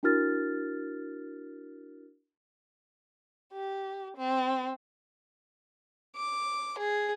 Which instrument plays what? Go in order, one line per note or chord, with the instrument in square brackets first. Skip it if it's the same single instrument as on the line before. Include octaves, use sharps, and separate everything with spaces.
[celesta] D4 E4 F#4 A#4 F6 A6
[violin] G4
C4
[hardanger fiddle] D6
G#4